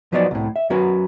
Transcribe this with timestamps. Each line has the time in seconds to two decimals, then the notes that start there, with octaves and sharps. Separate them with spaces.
0.12 F3 F#3 B3 D#4 E4 D5
0.31 C2 A2
0.56 E5
0.70 F#3 C#4 F#4 A#4 B4